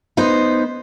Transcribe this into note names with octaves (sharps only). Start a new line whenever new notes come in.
B3 D#4 B4 C5